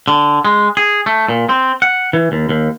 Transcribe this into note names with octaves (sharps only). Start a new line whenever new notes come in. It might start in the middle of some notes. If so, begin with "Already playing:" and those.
D3
G#3
G#4
A3
A#2
C4
F#5
E3
D#2
D#2